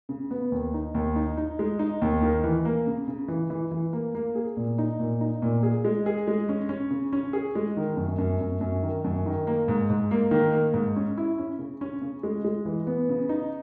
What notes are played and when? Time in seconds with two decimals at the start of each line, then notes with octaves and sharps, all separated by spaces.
0.09 C#3
0.31 B3
0.52 D#2
0.74 D#4
0.94 D#2
1.16 D#4
1.37 D#4
1.59 G#3
1.79 D#4
2.02 D#2
2.22 D#3
2.44 E3
2.65 A#3
2.87 C#3
3.08 C#3
3.28 E3
3.50 E3
3.71 E3
3.93 A#3
4.15 A#3
4.35 G#4
4.57 A#2
4.78 D#4
4.99 A#2
5.21 D#4
5.42 A#2
5.63 G#4
5.85 G#3
6.06 G#4
6.27 G#3
6.49 C#4
6.69 C#4
6.90 C#3
7.13 C#4
7.33 G#4
7.55 G#3
7.77 D#3
7.97 F#2
8.18 F#2
8.41 F#2
8.61 F#2
8.83 D#3
9.04 F#2
9.26 D#3
9.47 A#3
9.68 G#2
9.90 G#2
10.11 A#3
10.31 D#3
10.52 A#3
10.74 G#2
10.96 C#4
11.18 E4
11.38 C#4
11.59 C#3
11.81 C#4
12.02 C#3
12.23 G#3
12.45 G#3
12.65 E3
12.87 B3
13.09 C#3
13.29 D#4